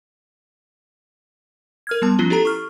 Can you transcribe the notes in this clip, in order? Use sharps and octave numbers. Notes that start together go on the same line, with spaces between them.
A#4 F6 G#6
G3 B3 A5
F3 C#4 F4 G7
E4 G4 A4 A#5
C#6 F6